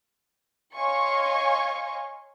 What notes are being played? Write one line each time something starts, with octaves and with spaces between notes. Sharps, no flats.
C#5 D#5 F5 G#5 C6 C#6